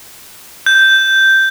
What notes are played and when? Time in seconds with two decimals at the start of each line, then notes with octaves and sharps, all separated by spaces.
0.66 G6